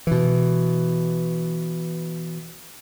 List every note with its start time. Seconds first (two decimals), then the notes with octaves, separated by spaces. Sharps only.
0.07 B2 E3